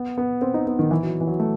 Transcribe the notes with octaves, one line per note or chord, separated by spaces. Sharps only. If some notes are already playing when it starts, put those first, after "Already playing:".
Already playing: B3
B3
C4
D#4
B3
D#3
E3
F#3
E3
F#3
A3